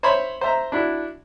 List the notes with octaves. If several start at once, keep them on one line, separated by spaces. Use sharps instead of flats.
C5 C#5 E5 B5 C6
C5 E5 A#5
D4 E4 F#4